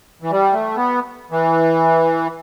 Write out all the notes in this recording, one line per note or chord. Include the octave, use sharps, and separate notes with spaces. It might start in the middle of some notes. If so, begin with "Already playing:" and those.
E3
G3
A3
B3
E3